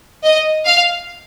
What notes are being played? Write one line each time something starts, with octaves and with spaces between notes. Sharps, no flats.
D#5
F5